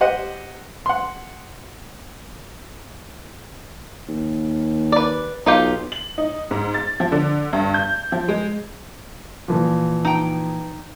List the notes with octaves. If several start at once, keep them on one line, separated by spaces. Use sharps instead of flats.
G4 C5 D#5 F#5
F#5 C6
D#2
B4 D5
B1 D#4 F4 G4
F#7
D#4
G#2
A6
F3
D3
G2
G6
F3
G#3
A#2 E3 F3
D#4 G5